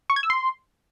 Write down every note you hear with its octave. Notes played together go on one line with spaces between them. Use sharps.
C#6
G#6
E6
C6